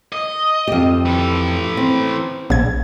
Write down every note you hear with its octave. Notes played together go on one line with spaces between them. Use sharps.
D#5
F2 G4
E3 A4
C4
A#1 G#6